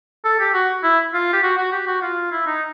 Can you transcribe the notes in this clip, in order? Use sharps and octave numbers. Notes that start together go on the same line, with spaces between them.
A4
G4
F#4
E4
F4
G4
F#4
F#4
G4
F#4
F4
E4
D#4